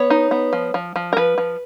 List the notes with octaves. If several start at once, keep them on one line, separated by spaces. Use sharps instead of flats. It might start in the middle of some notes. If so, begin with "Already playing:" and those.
Already playing: B3 C#5
D#4
B3
F3
F3
F3
A#4
F3 B4
F3